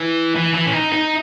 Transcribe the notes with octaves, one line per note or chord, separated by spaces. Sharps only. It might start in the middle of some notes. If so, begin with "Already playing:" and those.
Already playing: E3
E3
E3
C#4
D#4
D#4